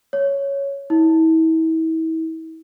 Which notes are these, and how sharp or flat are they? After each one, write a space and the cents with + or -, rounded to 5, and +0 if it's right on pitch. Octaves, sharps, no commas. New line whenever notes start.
C#5 +5
E4 -40